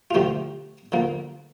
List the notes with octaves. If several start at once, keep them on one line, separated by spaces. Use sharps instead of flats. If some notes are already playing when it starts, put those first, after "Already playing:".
F4
D3 F3 A3 G4
D3 F3 A#3